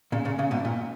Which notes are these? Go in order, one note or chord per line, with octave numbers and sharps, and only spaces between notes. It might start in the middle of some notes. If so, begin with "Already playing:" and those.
A#2 C#3
A#2 C#3
A#2 C#3
G#2 B2
A#2